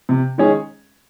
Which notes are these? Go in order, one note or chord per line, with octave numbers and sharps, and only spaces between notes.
C3
D#3 G#3 C#4 G#4